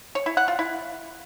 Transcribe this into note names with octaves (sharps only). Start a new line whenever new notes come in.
C#5
E4
F#5
F4
E4